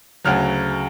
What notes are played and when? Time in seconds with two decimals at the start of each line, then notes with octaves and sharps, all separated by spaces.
0.24 D2 C#3 F#3 F6